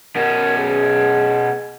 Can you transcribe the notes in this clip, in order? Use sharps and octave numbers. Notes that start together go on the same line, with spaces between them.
B2 C#4 A#4
G#4